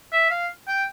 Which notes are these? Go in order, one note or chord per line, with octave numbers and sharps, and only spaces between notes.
E5
F5
G5